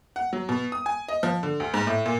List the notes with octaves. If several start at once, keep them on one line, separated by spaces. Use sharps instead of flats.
F#5
F#3
B2
D#6
G#5
D#5
F3
D3
D2
G#2
A2
A#2